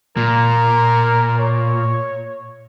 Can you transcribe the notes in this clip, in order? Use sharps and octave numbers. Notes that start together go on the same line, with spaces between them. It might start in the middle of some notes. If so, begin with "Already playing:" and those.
A#2 A#4
C#5